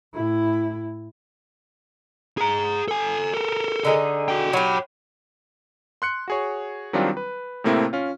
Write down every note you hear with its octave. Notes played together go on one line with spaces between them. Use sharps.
A2 E4
G#4 A#5
A4 G#5
A4 A#4
D3 D#4 G#4
F#4 G5
F#3 G4 C#5 B5
C6 F#6 C#7
F#4 G#4 C#5
D#3 F#3 G3 C4 D4 F4
B4
A2 C3 A3 A#3 C4 E4
C#4 F4